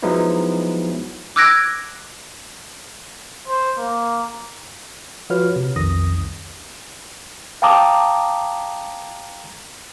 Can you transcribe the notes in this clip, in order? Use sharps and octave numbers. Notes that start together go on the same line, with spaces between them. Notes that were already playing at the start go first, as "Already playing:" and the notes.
F3 F#3 G#3 B3 D#4 E4
D6 E6 F#6 G#6 A#6 D7
C5
A#3
F3 F4 F#4 B4 C#5 F6
C3
B1 F2 D#3 D#6 A#6
C2
F5 G5 A5 A#5 D6 D#6